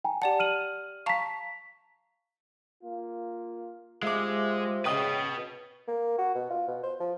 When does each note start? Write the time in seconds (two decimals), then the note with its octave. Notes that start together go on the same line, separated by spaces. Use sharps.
0.04 G5 G#5 A#5
0.22 G4 D5 F#5 A5
0.40 F6 D#7 F#7
1.06 F5 A5 A#5 C#6 B6
2.82 A#3 F4
4.03 G#3 F4 G4 C5 E5 D6
4.85 C#3 B4 D#5 G5 D#6
5.88 A#3
6.18 F#4
6.35 B2
6.50 F4
6.68 B2
6.83 C5
7.00 F3